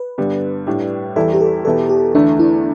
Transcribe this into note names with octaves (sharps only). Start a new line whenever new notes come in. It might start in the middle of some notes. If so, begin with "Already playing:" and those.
Already playing: B4
G2 D3 G3 B3
A2 G3 D4 G4
E2 E3 G3 E4 G4 A4
G4
A4
E2 B2 B3 E4 G4 A4
G4
E2 D3 A3 D4 E4
E4